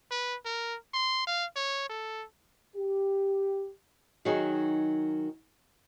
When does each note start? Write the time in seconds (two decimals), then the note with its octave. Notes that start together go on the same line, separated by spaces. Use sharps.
0.11 B4
0.45 A#4
0.94 C6
1.27 F5
1.56 C#5
1.89 A4
2.75 G4
4.25 D#3 F#3 D#4 F#4 G#4